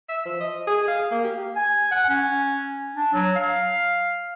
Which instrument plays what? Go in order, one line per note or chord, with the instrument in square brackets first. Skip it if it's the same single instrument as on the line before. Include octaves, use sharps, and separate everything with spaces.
[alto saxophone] E5
F3
D#5
G#4
F5
A#3
G4
[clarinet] G#5
F#5
C#4
D4
F#3
F5